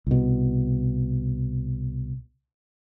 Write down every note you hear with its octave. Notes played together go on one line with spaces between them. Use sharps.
C2 B2